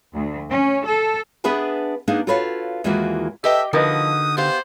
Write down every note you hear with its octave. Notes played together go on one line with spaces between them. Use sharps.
D2
C#4
A4
B3 D4 G#4 B4 E5 G#5
A#3 B3 D4 D#4 G#4
F4 F#4 A4 B4 C#5 F5
D#2 E3 G#3 A#3 F4 F#4
G4 A4 B4 D#5 E5 G5
D3 F3 D#4 F#4 A#4 B4 D#5 D#6
B3 G4 C5 F5